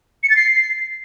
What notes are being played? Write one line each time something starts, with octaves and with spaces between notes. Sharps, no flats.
C#7
A6
C7